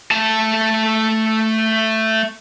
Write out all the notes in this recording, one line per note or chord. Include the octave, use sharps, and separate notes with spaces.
A3 A5